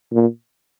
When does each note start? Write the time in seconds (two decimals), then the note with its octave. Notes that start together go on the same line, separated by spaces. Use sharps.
0.12 A#2